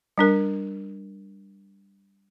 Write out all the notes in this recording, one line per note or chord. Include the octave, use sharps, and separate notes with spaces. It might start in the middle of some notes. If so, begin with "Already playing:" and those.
G3 D4 A#4